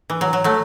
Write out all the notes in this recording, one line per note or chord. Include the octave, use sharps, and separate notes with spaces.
E3
F#3
F#3
F#3 A3